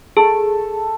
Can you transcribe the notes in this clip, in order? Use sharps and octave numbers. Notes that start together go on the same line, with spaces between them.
G#4 A4